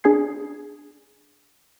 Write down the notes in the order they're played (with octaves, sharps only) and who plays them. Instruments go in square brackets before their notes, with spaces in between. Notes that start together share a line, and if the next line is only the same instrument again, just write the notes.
[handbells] D4 G#4 G#5 G#6 C7